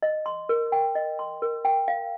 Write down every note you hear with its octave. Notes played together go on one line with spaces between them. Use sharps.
D#5
C6
A#4
G5
D#5
C6
A#4
G5
F5